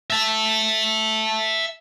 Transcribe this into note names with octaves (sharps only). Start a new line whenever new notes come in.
E5 A5